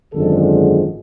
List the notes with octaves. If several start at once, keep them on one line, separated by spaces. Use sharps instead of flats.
G#1 F#2 D3 F3 G#3 A4